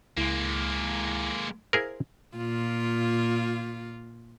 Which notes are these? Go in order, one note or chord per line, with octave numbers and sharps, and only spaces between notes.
C#2 G#3 A#3 E4 B6
E4 G#4 A#4 C5 F5
A#2 F4